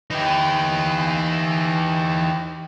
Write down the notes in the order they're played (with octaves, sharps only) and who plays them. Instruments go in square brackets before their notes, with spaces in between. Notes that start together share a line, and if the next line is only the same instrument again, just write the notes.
[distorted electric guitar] E3 [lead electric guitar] D#4 G4